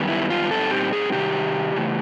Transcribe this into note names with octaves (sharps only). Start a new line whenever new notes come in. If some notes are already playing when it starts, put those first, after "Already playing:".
Already playing: F#2 D#3 G3 B3
E4
F4
A#2 G3 C4 D#4 A4
G4
G#4
C3 D#3 G3 G4
C#3 E3 A3